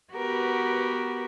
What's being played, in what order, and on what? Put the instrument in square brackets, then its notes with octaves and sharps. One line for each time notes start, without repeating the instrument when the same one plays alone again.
[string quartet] B3 F#4 G4 A#4 B4